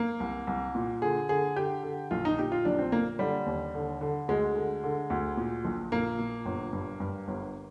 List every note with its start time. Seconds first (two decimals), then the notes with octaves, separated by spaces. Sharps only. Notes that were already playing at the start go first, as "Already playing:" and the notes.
Already playing: A#3
0.20 C2
0.47 C2
0.75 A#2
1.02 D3 G#4
1.29 D3 G#4
1.56 D3 G4
1.83 D3
2.11 A#1 F4
2.25 D#4
2.38 A#2 G4
2.52 F4
2.65 A#1 D4
2.79 C4
2.92 A#2 A#3
3.19 D3 G3
3.46 D#2
3.74 D3
4.01 D3
4.28 D2 G#3
4.56 D3
4.83 D3
5.10 D2
5.37 A#2
5.65 A#1
5.92 A#2 A#3
6.19 A#2
6.46 G1
6.73 G2
7.00 G2
7.28 G1